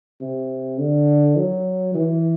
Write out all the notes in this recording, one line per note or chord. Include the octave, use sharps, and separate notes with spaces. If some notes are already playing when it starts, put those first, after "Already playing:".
C3
D3
F#3
E3